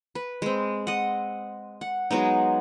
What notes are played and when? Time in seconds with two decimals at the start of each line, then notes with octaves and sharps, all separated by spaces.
0.15 B4
0.42 G#3 C4
0.87 D#5 F#5
1.81 F#5
2.11 F#3 G#3 B3 D#4